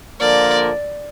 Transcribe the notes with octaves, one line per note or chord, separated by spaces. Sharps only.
D3 F3 A#3 F4 A#4 D5